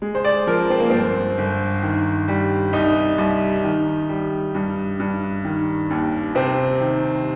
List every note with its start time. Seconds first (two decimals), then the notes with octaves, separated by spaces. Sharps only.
0.02 G#3
0.15 C5
0.25 D5
0.47 F3 A#4
0.70 C4
0.80 A#3
0.90 G1 C4
1.38 G1
1.83 D#3
2.28 G3
2.73 C2 D#4
3.18 C2
3.64 D#3
4.09 G3
4.55 G2
5.00 G2
5.45 D#3
5.90 D#2
6.35 C3 C4
6.80 D#3